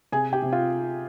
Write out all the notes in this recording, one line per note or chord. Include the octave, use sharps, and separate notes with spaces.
C3 G#4 G#5
G4 G5
C3
F4 F5